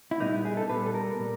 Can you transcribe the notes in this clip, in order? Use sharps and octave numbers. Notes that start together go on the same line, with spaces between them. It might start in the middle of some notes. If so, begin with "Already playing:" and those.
E4
A#2 G3 B3 D4 D#4
E4
G#4
A4
A#2 G3 B3 B4
A4
A#4
A#2 G3